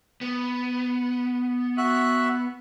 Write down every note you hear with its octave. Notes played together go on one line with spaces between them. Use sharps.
B3
F#4 E5 F#6